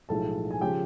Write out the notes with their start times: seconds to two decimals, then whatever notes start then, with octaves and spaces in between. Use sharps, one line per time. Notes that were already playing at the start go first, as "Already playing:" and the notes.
0.09 B1 A2 F3 G#3 A4 A5
0.51 G#5
0.61 C#3 F3 G#3 G4 G5